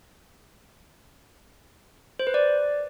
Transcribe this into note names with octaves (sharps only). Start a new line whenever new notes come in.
C5
B4
D5